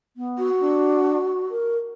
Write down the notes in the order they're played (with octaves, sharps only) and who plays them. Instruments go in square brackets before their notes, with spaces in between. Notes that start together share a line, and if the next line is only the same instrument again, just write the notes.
[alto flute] B3
[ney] F#4
[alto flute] D4
A#4